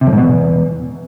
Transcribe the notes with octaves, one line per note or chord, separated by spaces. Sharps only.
C3
F2
G#2
B2
E2